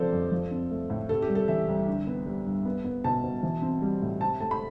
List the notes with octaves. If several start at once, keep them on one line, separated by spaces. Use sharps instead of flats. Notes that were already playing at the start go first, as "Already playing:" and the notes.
Already playing: C3 F3 C4 A4 C5 D5
F2
F3
C4
A3
A2
C3 A4
G4
G3
A4
E3 E5
C2
D3
B3
G3
G2
B3
B3
B2 A5
B2
E3
C4
G3
A2
C3 A5
A3 A5
B5